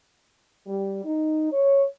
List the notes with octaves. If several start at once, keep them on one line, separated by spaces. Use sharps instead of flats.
G3
D#4
C#5